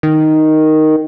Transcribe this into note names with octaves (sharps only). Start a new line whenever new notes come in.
D#3